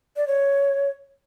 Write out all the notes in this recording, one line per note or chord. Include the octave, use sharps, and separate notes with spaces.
D5
C#5